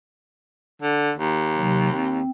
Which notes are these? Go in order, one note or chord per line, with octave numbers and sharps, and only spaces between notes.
D3
D#2
C3 F#3
C4